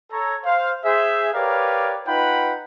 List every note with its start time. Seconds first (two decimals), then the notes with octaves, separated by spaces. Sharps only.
0.12 A4 C#5 A#5
0.45 C5 F5
0.85 G#4 C5 E5
1.34 G4 A#4 B4 C#5 D5 F5
2.07 D#4 F4 B4 F#5 G5 B5